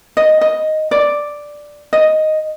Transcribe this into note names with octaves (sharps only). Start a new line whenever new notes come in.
D#5
D#5
D5
D#5